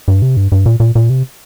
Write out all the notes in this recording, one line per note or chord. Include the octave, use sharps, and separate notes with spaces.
G2
C3
G2
G2
A#2
A#2
A#2
C3